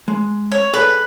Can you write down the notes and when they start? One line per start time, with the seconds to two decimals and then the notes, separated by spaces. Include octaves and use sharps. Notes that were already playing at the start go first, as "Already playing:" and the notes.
0.08 G#3
0.52 C#5
0.74 G#4 A4 B4 D5